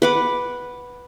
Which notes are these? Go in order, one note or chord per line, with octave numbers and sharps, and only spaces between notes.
B4 F#5 D6